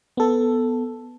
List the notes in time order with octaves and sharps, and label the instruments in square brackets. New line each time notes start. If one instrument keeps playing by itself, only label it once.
[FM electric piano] B3 A4